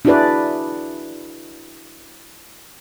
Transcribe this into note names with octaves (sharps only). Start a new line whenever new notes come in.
D4 E4 F#4 G#4 B4 D5